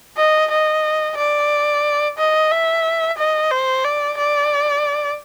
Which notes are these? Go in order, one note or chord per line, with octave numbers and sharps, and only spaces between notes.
D#5
D#5
D5
D#5
E5
D#5
C5
D5
D5